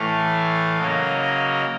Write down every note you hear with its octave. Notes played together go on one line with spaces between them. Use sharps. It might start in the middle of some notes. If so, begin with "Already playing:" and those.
Already playing: A2 E3 A3 F5
C#3 F#3 A#3 D#5
D#5